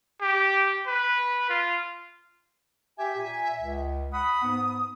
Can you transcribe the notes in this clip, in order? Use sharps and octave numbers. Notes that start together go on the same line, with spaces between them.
G4
B4
F4
G4 E5 G#5
A#2 G#5
C#2
F#5 B5 D#6
G#2 B3